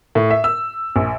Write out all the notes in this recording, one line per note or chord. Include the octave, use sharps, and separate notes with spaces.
A2
E5
E6
A#1